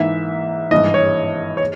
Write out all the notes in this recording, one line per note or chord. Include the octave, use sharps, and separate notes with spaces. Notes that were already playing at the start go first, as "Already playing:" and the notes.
Already playing: G#2 E3 A#3 E5
G#1 G2 E3 D#5
C#5
C#5